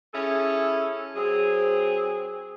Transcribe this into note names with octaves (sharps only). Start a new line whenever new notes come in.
C#4 E4 G#4 A4
F#3 C4 G#4